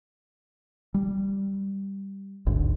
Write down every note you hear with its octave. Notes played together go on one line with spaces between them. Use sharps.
G3
G#1 D2 G2